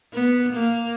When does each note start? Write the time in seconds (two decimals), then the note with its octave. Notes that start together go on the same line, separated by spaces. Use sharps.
0.14 B3
0.52 A#3